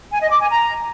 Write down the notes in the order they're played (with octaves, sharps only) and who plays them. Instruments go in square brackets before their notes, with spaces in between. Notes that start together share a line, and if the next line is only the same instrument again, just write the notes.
[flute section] G#5
D#5
D6
G#5
A#5